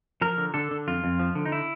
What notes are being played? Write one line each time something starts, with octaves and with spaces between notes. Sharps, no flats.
F3 A#4
D3
D3 A4
D3
F2 F4
F2
F3
D3
D#4
E4